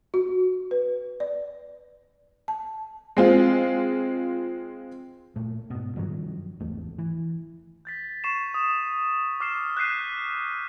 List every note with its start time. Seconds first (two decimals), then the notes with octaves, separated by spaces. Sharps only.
0.14 F#4
0.71 B4
1.20 D5
2.48 A5
3.17 G#3 C4 F4
5.36 A#2 A3
5.70 G#2 B2
5.96 G2 D#3 F3 F#3
6.60 G#1 E2 A3
6.98 E3
7.85 G6 A6 B6
8.24 C#6 C7 D#7 E7
8.54 D#6
9.40 D6 F6 C7 E7
9.77 F#6 G6 B6 C7 D#7